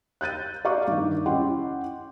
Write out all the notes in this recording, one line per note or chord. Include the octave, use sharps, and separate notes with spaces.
F#6 G6 A6 D#7
D5 F5 A#5 C#6 D6
G2 D#3
C#4 E4 D#5 F#5 G5 C6